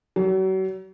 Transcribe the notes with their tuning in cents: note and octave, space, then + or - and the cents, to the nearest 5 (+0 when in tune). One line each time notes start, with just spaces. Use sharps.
F#3 +40